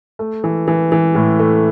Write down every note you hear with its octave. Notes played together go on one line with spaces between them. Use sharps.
A3
E3
E3
E3
A2
A3